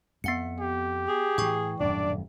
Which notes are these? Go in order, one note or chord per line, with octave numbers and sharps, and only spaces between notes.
F2 B3 F#5 C#7
G4
G#4
A2 E3 G5 C#6
D#1 F#2 A2 D4 D5